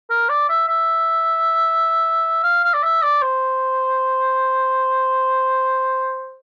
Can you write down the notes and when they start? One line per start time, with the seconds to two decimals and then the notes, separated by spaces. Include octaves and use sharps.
0.10 A#4
0.29 D5
0.49 E5
0.68 E5
2.44 F5
2.64 F5
2.74 D5
2.83 E5
3.03 D5
3.22 C5